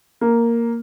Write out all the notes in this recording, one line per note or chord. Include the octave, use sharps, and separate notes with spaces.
A#3